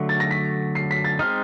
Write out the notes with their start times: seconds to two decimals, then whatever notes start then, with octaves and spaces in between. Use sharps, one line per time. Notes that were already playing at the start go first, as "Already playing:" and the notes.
Already playing: D3 F#3 A3
0.09 A6
0.20 A#6
0.31 B6
0.75 C7
0.91 B6
1.05 A6
1.19 G#3 C4 D#4 F6